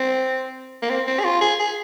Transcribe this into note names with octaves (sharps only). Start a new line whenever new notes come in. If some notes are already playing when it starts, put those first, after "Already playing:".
Already playing: C4
A#3
C4
C4
G#4
F4
G#4
G#4